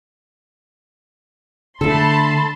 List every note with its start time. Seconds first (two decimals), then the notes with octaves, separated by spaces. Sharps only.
1.81 D3 A3 A4 A5 B5 C6